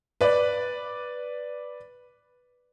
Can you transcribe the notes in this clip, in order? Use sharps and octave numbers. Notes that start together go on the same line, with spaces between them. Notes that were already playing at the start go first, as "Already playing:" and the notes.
B4 D5